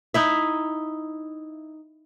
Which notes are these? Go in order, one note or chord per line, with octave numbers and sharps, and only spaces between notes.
D#4 E4 E5